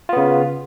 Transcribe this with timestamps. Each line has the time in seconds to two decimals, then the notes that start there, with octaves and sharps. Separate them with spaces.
0.09 F4
0.13 B3
0.17 C#3